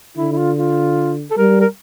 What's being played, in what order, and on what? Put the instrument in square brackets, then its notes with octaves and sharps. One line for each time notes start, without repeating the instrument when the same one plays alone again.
[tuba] D3 [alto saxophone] E4
[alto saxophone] E4
F4
F4
A4
[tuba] G3 [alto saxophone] A#4
[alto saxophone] A#4